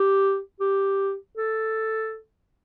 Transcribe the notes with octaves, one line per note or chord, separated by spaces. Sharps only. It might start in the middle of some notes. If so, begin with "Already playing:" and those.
Already playing: G4
G4
A4